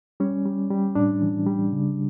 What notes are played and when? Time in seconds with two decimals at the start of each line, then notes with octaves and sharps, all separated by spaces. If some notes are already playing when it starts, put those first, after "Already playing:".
0.20 G3 C#4
0.45 G3
0.70 G3
0.95 A2 D4
1.21 E3
1.46 G3
1.72 C#3